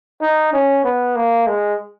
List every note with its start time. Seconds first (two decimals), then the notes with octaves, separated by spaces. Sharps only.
0.21 D#4
0.53 C#4
0.84 B3
1.16 A#3
1.47 G#3